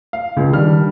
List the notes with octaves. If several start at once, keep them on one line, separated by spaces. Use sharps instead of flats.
F5
C#2 C#3
D#3 G3 D4 F6